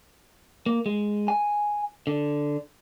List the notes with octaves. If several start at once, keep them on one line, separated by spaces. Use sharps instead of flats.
A#3
G#3
G#5
D3